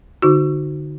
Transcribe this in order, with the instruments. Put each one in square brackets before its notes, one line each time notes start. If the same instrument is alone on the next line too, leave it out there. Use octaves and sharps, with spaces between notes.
[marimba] D3 D#4 F#4